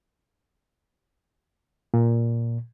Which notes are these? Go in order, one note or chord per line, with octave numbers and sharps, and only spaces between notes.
A#2